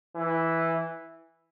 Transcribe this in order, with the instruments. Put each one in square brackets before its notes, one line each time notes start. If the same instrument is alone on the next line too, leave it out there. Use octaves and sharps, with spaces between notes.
[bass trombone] E3